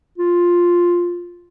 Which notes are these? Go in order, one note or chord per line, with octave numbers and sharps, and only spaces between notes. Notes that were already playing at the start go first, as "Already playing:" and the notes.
F4